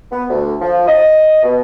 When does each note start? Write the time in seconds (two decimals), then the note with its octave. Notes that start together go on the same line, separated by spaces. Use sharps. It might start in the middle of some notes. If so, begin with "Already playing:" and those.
0.11 B3
0.30 D2
0.61 F3
0.88 D#5
1.43 B2